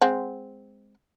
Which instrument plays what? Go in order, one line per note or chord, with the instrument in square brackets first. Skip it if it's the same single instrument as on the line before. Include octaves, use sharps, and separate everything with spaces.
[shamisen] G#3 C4 F#5